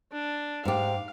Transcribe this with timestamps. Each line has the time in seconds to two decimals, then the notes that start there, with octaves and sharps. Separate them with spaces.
0.12 D4
0.65 G#2 G4 F5